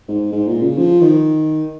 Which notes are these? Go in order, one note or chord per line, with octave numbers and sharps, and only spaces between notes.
G#2
G#2
A#2
C#3
F3
D#3